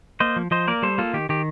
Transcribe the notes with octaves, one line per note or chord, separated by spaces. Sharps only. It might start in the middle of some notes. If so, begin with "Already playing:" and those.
A#3 C5 D#5
F3
F3 C5 D#5
A#3 A#4 D5
G3 A4 C5
A#3 F4 A4
D#3 G4
D#3 G4